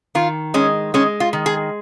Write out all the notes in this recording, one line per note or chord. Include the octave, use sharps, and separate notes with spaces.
D#3 F4
G#3 C#4
G#3 C#4
F4
D#3
G#4